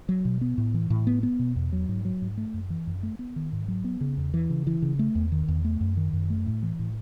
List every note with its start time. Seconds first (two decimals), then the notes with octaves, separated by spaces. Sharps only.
0.09 F#3
0.25 B2
0.41 B3
0.58 A2
0.74 E3
0.90 A2
1.07 B3
1.23 B3
1.39 B2
1.56 E2
1.72 F#3
1.89 G#2
2.05 F#3
2.22 G#2
2.37 A3
2.54 F#2
2.70 E3
2.87 F#2
3.03 A3
3.19 B3
3.36 D#3
3.52 G#2
3.68 F#3
3.84 B3
4.01 C#3
4.17 E2
4.34 E3
4.50 C#3
4.67 E3
4.82 C#3
4.99 A3
5.15 E2
5.32 D#3
5.48 E2
5.64 A3
5.81 F#2
5.97 D#3
6.13 F#2
6.30 A3
6.46 A2
6.63 E3
6.79 A2